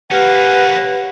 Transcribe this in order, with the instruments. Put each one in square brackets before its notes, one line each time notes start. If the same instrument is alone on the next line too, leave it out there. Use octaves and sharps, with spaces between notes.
[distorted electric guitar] A#3 C#4 [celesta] G4 F6 [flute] B4 [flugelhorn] F#5